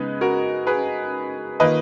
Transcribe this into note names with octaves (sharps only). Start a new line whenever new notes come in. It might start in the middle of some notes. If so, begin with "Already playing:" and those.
Already playing: C#3 G#3 B3 D#4 B4
F#4 A#4
G#4 B4
D#3 A#3 F4 B4 D#5